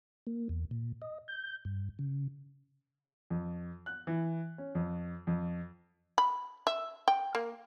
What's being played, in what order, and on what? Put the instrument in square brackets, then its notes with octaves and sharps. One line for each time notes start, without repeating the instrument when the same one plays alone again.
[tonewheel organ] A#3
E2
A#2
D#5
G6
G2
C#3
[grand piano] F2
F#6
E3
C#4
F2
F2
[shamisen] B5
E5
G5
A#3